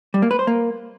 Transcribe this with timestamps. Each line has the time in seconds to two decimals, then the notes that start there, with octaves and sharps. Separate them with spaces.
0.14 G3
0.22 A#3
0.31 B4
0.39 C5
0.47 A#3